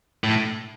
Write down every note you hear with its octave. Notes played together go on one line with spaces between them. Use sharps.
A2